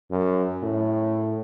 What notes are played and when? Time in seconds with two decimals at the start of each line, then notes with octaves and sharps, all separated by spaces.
0.11 F#2
0.63 A2